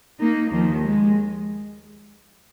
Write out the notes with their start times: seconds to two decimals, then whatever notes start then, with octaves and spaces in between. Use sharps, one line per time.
0.20 A#3 D#4
0.51 D#2 D#3 F3
0.83 G#3